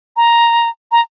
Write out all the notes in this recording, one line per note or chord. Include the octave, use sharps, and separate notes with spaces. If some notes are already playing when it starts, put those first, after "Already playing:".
A#5
A#5